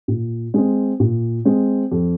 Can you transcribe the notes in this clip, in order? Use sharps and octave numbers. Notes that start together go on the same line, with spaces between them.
A#2
G#3 C4
A#2
G#3 C4
F2